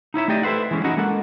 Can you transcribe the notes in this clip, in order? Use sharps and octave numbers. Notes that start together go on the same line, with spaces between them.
D#4 E4 C#5 E5
A3 D#4 G4 D5 D#5
E4 A4 B4 C5 F#5
E3 G#3 C#4
C#4 D#4 E4 F#4 D#5 F#5
G#3 A#3 A4 F#5